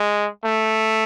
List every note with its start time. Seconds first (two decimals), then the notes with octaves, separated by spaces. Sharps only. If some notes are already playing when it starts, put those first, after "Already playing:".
Already playing: G#3
0.45 A3